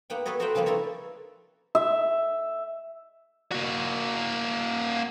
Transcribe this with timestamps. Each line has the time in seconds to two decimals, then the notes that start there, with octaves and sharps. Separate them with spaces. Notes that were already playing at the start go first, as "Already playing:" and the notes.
0.10 A#3 B3 F#5 G5
0.26 B3 A4 B4 C#5 D#5
0.40 F#4 A#4 C5 E5 F#5 G5
0.55 C#3 F3 G3 A#3 B3
0.66 E4 A4 A#4 C#5
1.75 E5
3.52 A#3 F#4